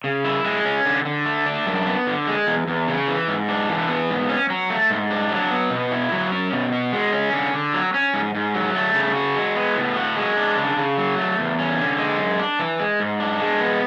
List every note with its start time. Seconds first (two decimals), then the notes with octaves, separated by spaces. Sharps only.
0.04 C#3
0.25 E4
0.45 G#3
0.65 C#4
0.85 D3
1.05 D3
1.26 A3
1.46 D4
1.66 F#2
1.86 B3
2.07 D3
2.27 G#3
2.47 E2
2.67 E2
2.88 C#3
3.08 E3
3.28 G#2
3.48 D4
3.69 E3
3.88 B3
4.09 G#2
4.29 C#4
4.50 F#3
4.70 A3
4.90 G#2
5.11 D4
5.31 F#3
5.51 B3
5.71 B2
5.92 E4
6.12 F#3
6.32 C#4
6.52 B2
6.72 F#4
6.93 G#3
7.13 C#4
7.33 D3
7.54 D3
7.74 F#3
7.94 C#4
8.14 G#2
8.35 G#2
8.54 F#3
8.75 A3
8.95 C#3
9.15 F#4
9.36 G#3
9.56 B3
9.76 A2
9.96 F#4
10.16 G#3
10.37 D4
10.57 C#3
10.77 C#3
10.98 F#3
11.18 A3
11.39 E2
11.59 C#4
11.78 D3
11.99 G#3
12.19 F#2
12.39 D4
12.59 E3
12.80 G#3
13.00 G#2
13.20 D4
13.40 G#3
13.61 B3